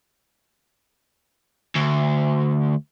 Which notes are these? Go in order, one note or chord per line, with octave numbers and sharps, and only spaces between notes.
D2